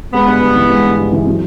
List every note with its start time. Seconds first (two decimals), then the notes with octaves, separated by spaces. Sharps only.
0.14 G#3 B3
0.28 G2
0.41 G2
0.55 E3
0.70 G#3
0.85 G2
0.98 G2
1.13 E3
1.27 F#3